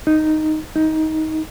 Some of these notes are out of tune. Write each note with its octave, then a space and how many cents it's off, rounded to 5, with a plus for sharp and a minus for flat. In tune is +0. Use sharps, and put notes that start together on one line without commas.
D#4 -5
D#4 +15